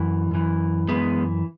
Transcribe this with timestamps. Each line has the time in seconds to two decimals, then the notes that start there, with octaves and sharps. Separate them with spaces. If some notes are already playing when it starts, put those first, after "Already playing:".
Already playing: F#2 E3
0.31 F#2 E3
0.88 F#2 E3 G#3 B3